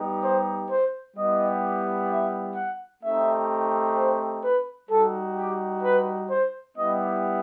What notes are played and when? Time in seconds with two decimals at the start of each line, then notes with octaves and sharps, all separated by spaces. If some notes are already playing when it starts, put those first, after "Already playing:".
Already playing: G3 B3 D#4 G4
0.23 C5
0.70 C5
1.16 G3 B3 E4 G4 D#5
2.10 E5
2.56 F#5
3.03 A3 C4 D#4 G4 E5
3.96 C5
4.42 B4
4.89 G3 D#4 F#4 A4
5.35 G4
5.82 B4
6.30 C5
6.75 G3 B3 E4 G4 D#5